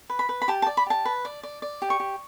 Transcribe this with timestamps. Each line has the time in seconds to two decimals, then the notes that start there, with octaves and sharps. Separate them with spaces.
0.10 B4
0.19 B5
0.29 B4
0.42 B5
0.48 G4 A5
0.62 A5
0.67 D5
0.77 B5
0.86 G4 A5
1.05 B4
1.25 D5
1.43 D5
1.62 D5
1.82 G4
1.90 C#6
2.00 G4